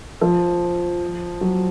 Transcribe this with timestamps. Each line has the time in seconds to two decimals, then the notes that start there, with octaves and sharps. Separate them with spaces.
0.21 F3
1.41 F#3